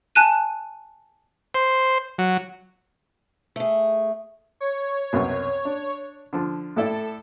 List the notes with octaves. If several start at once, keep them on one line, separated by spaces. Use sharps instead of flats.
G#5 A5 F#6 D#7
C5
F#3
A3 G#4
C#5
C2 F#2 B2
D4
D3 F3
A2 E4 A4 D5